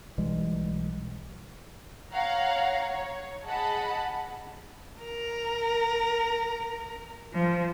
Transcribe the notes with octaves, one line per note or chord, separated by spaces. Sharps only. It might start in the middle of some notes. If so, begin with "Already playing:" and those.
B1 E3 G3 G#3
C#5 F5 F#5 A#5
C#5
G#4 D#5 F#5 A5 B5
A#4
F3